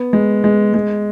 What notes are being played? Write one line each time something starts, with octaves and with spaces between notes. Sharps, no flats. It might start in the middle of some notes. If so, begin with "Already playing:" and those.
Already playing: B3
G#3
G#3
G#3